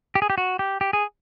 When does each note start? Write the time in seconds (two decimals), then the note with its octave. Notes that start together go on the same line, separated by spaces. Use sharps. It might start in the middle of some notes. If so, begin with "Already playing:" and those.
0.15 G4
0.22 G#4
0.30 G4
0.38 F#4
0.59 G4
0.81 G4
0.93 G#4